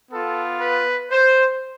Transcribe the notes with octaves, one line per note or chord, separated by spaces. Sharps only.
B3 F4 A4
B4
C5